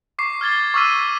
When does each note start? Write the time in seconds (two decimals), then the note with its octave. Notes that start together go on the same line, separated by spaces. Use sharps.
0.19 C#6 D6 C7
0.41 F6 G#6 A6 G7
0.74 C#6 D6 E6 F6 B6 D#7